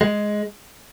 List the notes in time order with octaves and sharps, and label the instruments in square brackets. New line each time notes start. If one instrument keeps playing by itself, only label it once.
[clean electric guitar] G#3